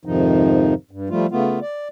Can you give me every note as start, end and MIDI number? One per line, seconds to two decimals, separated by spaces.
0.05 0.74 41
0.05 0.74 44
0.05 0.74 48
0.05 0.74 51
0.05 0.74 53
0.05 0.74 63
0.91 1.09 43
1.10 1.27 53
1.10 1.27 55
1.10 1.27 57
1.10 1.27 65
1.31 1.59 49
1.31 1.59 57
1.31 1.59 59
1.31 1.59 65
1.61 1.88 74